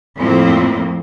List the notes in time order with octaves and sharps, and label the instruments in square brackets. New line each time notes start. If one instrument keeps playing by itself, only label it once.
[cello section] F2 A2 F3 A#3 C4